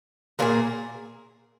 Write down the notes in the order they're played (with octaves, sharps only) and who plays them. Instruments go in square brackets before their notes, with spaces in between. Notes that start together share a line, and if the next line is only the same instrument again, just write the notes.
[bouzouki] A#2 A#3 E4 G#4